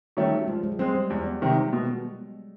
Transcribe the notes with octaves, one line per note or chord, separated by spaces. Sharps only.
D#3 F#3 G3 A3 C#4
F3 G#3
G#3
F#3
G3 G#3 C4
G3
E2 G#3
C3 D#3
B2